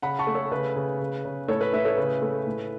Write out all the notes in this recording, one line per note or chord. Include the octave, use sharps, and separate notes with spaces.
C#3 F#5 B5
A5 C#6
A3
A4 C#5
C#3 B4
C#3
C#3
C#3
A2 A4 C#5
B4
A2 B4 E5
A4 C#5
C#3 B4
A3
A2